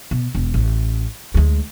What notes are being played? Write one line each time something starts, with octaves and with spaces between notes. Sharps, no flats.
B2
E1
A1
D2 G#3